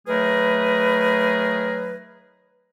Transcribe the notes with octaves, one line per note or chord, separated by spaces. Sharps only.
D#3 F#3 A3 G#4 A#4 B4